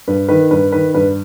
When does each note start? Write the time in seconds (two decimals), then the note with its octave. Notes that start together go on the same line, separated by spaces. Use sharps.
0.08 G2 B4
0.29 D#3 B4
0.51 G2 B4
0.72 D#3 B4
0.94 G2 B4